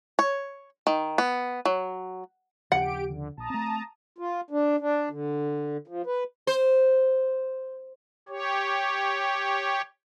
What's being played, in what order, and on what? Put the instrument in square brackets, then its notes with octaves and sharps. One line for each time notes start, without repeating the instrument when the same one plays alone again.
[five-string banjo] C#5
D#3
B3
F#3
[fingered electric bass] D#2 C#3 F3 [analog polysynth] G4 D7 [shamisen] F#5
[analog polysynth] D3
[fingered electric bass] A#1 [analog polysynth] A5 A#5 D#6
[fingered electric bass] A3 C4
[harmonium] F4
D4
D4
D3
F3
B4
[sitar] C5
[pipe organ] G4 C#5